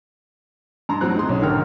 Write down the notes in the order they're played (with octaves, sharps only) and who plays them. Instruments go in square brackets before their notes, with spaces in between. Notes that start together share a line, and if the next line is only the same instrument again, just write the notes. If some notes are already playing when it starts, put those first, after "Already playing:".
[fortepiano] G2 A#5 C6
A2 F#3 C4 F#6
D#4 G#4 C6
B1 C#4 C#5
G#1 D3 A#4 G5 F6